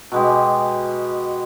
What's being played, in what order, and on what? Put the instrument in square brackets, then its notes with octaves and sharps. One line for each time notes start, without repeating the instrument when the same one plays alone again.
[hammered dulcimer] B2 G#3 G4